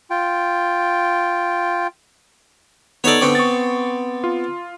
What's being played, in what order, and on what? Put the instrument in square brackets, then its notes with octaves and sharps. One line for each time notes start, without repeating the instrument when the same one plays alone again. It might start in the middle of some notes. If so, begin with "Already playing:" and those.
[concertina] F4 G5
[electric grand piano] B3 D#4 A4 [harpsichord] C#5 D5
[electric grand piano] D3 C#6 D6 [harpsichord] B3 C4
[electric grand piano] C#6 D#6 A6
F4